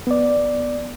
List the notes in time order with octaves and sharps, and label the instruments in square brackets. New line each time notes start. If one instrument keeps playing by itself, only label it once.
[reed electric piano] B3 D5